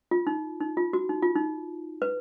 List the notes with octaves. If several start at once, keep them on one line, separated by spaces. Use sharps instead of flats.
F4
D#4
D#4
F4
F#4
D#4
F4
D#4
B4